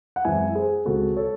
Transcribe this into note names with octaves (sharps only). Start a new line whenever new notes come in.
F#5
F#2 E3 G#3 C4 E5 G#5
G#4 C5
C#2 C#3 G#3 C4 F#4 A4
A4 C#5